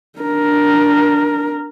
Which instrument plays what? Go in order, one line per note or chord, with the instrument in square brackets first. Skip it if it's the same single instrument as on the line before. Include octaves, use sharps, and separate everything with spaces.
[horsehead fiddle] D4 A#4